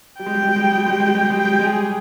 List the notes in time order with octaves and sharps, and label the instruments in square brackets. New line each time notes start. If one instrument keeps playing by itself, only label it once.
[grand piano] G3 [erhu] G5
[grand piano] G#3
G3
G#3
G3
G#3
G3
G#3
G3
G#3
G3
G#3
G3
G#3
G3
G#3
[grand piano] G3 [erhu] G5
[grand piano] G#3
G3
G#3
[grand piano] G3 [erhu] G#4